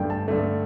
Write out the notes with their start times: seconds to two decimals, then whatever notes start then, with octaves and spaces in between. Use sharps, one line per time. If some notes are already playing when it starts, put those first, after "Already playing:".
Already playing: G2 D3 A3 G5
0.10 A5
0.28 G2 D3 A3